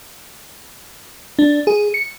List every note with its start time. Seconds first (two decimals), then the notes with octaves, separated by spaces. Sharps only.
1.39 D4
1.67 G#4
1.94 C#7